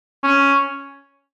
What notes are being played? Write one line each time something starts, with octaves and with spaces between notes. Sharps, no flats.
C#4